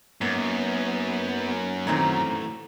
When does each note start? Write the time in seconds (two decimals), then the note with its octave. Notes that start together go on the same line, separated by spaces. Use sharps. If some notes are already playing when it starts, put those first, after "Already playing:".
0.21 F#2 A#3 B3 D#4
1.87 A#2 D#3 E3 A3 C4